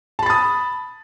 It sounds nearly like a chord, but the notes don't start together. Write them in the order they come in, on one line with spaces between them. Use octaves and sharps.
A5 B5 A6 D#6